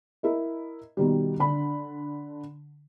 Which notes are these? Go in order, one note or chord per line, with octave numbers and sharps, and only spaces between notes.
E4 A#4 D#5
B2 D#3 G3
D3 D4 B5